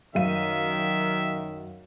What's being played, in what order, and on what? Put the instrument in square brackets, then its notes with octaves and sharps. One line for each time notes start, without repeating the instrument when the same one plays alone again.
[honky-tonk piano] F#2 F5 D#7 [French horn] D#3 [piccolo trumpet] E5